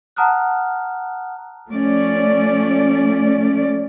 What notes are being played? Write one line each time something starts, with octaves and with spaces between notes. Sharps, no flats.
F#5 A5 A#5 D#6 F6 F#6
F3 A3 C#4 D5